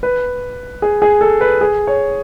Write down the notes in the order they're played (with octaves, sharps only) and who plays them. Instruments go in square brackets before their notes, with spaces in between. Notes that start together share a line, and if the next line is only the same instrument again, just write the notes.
[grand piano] B4
G#4
G#4
A4
B4
G#4
C#5